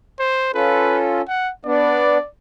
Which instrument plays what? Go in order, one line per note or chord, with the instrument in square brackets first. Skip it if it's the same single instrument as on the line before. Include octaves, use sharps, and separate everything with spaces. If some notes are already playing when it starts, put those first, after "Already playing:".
[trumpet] C5
[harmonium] C#4 F4 A4 [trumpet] B4
[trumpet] F#5
[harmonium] B3 D4 [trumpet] D5